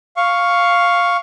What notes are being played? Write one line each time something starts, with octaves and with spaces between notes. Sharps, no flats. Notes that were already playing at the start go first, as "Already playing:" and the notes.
F5 C#6